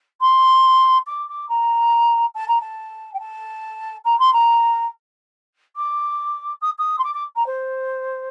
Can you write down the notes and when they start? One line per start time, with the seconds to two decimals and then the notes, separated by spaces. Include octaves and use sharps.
0.21 C6
1.07 D6
1.29 D6
1.49 A#5
2.35 A5
2.48 A#5
2.61 A5
3.13 G5
3.20 A5
4.05 A#5
4.19 C6
4.33 A#5
5.76 D6
6.61 D#6
6.78 D#6
6.99 C6
7.04 D6
7.14 D6
7.36 A#5
7.46 C5